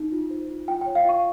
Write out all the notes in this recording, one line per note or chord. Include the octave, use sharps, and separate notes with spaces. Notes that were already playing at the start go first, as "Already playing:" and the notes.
Already playing: D#4
F4
C5
F4
F4 G5
G5
C#5
F5
F4 C#6